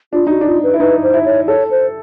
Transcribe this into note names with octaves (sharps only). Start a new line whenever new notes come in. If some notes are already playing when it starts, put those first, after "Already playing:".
D4 F4
D#4 F#4
D4
F4
B4
E4
D#4 B4
C5
E4
C#5
A4 C#5
C5